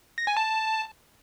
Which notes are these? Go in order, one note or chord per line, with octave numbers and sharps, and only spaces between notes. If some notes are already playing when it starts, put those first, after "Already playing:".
A#6
G#5
A5